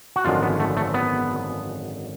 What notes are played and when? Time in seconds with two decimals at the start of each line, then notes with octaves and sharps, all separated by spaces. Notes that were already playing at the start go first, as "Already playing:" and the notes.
0.16 F#4
0.25 G#1 F#2 D3 F3 G#3 F4
0.42 B3
0.60 A3
0.77 A3
0.94 B3